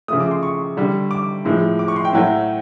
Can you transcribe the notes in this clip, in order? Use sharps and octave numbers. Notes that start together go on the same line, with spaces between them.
C#3 F3 A3 D#6
D6
C6
C#6
D3 G3
D6
A2 F3 G#3
D6
C#6
C6
G5
A2 F#3 A3